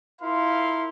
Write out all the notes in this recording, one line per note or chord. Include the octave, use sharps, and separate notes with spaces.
E4 F4 A#4 F5 C6